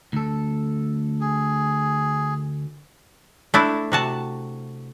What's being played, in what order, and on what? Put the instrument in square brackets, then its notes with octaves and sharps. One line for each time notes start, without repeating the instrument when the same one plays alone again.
[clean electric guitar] D2 A4
[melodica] G#4
[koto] A3 D4 E4
C3 F#4 A5